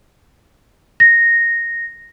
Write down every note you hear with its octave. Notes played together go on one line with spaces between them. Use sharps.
A#6